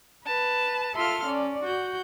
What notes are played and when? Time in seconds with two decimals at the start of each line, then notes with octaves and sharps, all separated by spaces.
0.25 B4 A5
0.95 F4 A4 E5 F5 C6 F6
1.26 C#4 D5
1.63 F#4 G6